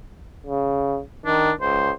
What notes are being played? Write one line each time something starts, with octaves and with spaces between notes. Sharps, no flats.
C#3
D#3 D4
C#2 C5